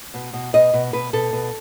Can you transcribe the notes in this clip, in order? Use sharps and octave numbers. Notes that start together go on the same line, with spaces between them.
B2
B2
B2 D#5
B2
B2 B4
B2 A4
B2